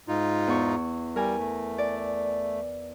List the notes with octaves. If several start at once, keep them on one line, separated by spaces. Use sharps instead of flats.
G#2 D#4 F4
E2 C#6
G3 A#4 G#5
A3
D5